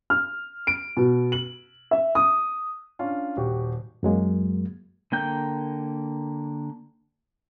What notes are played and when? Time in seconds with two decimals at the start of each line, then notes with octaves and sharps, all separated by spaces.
0.10 F6
0.67 D7
0.97 B2
1.32 F#7
1.91 E5
2.15 D#6
2.99 C#4 D4 F4
3.37 D#1 F#4 G4
4.03 F#2 F#3 G#3 A#3
5.12 D3 A#3 G5 G6